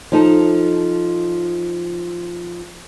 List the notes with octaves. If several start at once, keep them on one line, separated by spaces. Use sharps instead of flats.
F3 D#4 A4